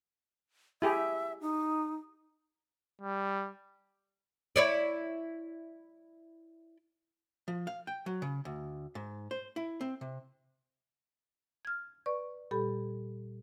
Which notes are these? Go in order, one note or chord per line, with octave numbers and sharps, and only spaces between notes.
E4 G4 G#4 E5
D#4
G3
E4 C#5 D5
F3
F5
G5
F#3
C#3
D2
G#2
C5
E4
C4
C3
F6 G#6
B4 D5 C#6
A#2 G3 G4 A4 B5